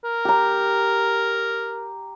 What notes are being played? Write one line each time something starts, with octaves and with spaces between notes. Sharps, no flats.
A#4
G4 A#5